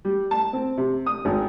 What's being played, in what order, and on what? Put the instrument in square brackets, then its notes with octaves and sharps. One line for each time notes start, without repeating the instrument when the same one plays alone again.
[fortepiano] G3
A5
C4
C3
D#6
G#1